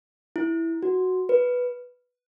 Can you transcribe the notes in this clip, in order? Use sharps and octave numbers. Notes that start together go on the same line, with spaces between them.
E4
F#4
B4